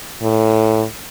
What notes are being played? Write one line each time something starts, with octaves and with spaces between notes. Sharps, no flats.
A2